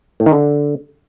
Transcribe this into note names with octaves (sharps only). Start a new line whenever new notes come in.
A2
D#3
D3